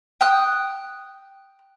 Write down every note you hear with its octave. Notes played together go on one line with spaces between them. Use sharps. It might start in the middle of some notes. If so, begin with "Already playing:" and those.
G5 D#6 F#6